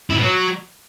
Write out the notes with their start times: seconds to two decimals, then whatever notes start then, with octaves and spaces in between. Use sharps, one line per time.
0.10 E4
0.16 B2
0.22 F#3